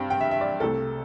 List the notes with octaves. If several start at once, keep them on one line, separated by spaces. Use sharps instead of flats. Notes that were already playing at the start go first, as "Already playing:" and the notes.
Already playing: G2 G3 C4 G5
G5
E5
E5
D5
C2 C3 A3 A4